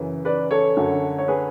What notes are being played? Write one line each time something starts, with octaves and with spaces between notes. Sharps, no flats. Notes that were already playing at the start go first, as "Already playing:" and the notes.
Already playing: F#2 C#3 E3
B4 D5
A4 C#5
F#2 D3
C#5
G#4 B4